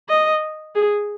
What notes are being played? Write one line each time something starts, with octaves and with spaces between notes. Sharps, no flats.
D#5
G#4